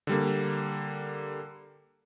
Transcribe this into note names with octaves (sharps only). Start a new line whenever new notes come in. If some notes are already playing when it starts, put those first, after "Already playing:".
D3 G3 A#3